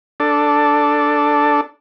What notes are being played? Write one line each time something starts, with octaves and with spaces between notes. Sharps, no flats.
D4 A4